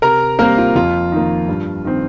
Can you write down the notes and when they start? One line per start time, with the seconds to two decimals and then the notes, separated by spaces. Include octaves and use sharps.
0.02 C3 A#4 A#5
0.39 G3 A#3 C4 A#4
0.58 F4
0.75 F2 F4
1.12 D#3 A#3
1.48 G2
1.85 D#3 C4